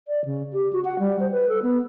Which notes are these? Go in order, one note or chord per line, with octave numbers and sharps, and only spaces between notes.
D5
C#3
G4
F#4
F#5
G3
C5
B4
A4
B3